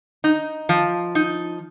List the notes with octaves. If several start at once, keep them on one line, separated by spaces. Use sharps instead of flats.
D#4
F3
D#4